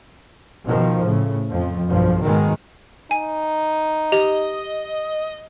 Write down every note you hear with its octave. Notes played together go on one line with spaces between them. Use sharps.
B2 D#3 F3
A2 C#3
F2 F3
B1 G2 F3
G#2 B2 D#3 G#3
D#4 G#5
G4 D#5